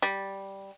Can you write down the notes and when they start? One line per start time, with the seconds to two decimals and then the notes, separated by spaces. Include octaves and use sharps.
0.02 G3